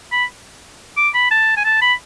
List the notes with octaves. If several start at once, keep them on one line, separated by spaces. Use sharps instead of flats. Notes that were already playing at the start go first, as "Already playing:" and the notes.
B5
D6
B5
A5
G#5
A5
B5